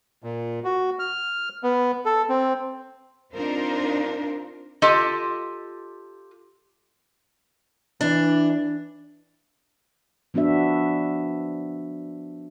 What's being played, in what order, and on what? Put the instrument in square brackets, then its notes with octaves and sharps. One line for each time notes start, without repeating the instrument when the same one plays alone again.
[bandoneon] A#2
F#4
F6
B3
A4
C4
[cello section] C4 D4 D#4 F4 A#4 C5
[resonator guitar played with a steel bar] F4 G4 A4 D#5
[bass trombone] E3 [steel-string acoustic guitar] D4
[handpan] F3 B3 D4 F#4 E5